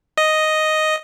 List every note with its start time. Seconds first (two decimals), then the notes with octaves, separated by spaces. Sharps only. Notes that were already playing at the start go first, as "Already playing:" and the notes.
0.17 D#5